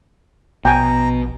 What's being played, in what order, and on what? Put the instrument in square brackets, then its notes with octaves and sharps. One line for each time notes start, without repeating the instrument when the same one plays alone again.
[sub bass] A#1 [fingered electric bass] B2 [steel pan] G5 G#5 [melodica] A#5